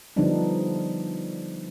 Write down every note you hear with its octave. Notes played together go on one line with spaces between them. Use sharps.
D3 F3 G3 B3 D4 D#4